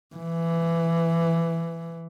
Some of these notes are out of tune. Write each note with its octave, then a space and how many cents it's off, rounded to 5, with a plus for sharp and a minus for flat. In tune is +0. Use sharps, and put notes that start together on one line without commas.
E3 +15